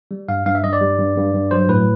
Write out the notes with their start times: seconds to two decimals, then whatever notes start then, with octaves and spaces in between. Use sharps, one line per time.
0.11 G3
0.28 G2 F5
0.46 G2 F5
0.55 E5
0.64 G2 D#5
0.73 D5
0.81 G3
0.99 G2
1.17 G2
1.34 G2
1.51 F#3 C5
1.69 A2 B4